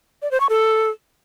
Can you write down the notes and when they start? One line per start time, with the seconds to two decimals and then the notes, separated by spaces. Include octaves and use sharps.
0.22 D5
0.31 C5
0.40 C#6
0.49 A4